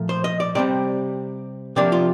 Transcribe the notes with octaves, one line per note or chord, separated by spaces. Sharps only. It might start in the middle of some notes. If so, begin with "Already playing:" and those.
Already playing: A#2 F3 A3
C5
D#5
D5
C3 G3 C4 D5
C3 F3 A#3 D4 D5
F4